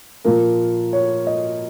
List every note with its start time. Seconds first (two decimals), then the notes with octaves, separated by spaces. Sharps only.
0.25 A#2 F3 A#3 A#4
0.93 C#5
1.27 D#5